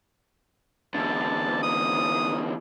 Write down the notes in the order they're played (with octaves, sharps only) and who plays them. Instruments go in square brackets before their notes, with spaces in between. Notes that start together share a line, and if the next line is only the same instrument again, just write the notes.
[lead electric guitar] E2 D3 [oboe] A5
[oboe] D#6